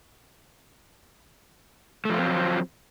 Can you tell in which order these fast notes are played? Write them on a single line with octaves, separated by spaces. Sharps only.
A3 F3 F4 C4 F#3